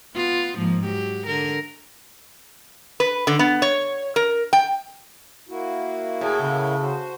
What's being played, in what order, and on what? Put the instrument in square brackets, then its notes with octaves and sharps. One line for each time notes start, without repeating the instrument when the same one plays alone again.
[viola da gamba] B3 F4
G#2 F3 A#3
F#3 G4
D3 A#4
[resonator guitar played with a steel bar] B4
D3
B3
C#5
A#4
G5
[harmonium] A#3 E4 F#4
[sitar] A2 [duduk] G#4
[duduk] C#3
[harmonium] F#4 C5